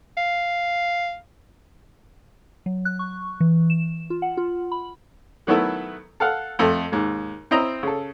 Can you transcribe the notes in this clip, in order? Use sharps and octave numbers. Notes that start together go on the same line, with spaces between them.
F5
F#3
F#6
C#6
E3
E7
F4
F#5
F4
B5
D#3 F#3 A3 B3 E4
A4 F5 F#5
F2 A3
D#2 G#2
C4 E4 D#5 A#5
C#3 A4